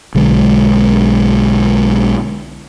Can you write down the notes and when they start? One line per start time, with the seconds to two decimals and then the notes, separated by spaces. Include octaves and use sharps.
0.15 B1 D3 G#3